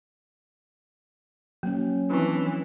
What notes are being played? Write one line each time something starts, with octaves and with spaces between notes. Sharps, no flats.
F#3 A#3 C#4
E3 F3 C4 D4